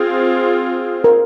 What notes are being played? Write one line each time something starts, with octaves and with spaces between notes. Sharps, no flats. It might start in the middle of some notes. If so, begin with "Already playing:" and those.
Already playing: C4 F4 G#4
A#4